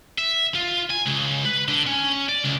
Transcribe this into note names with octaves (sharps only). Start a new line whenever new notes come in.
E5
F4
G#5
C#2
B4
D3
C#4
D5
C#2